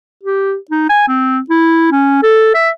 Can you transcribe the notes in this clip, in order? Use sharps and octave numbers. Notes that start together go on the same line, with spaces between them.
G4
D#4
G#5
C4
E4
C#4
A4
E5